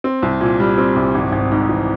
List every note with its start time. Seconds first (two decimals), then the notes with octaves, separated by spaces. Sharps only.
0.04 C4
0.22 C2
0.41 A#2
0.60 G3
0.78 C4
0.96 C2
1.15 G#1
1.32 G#1
1.51 G#2
1.69 E3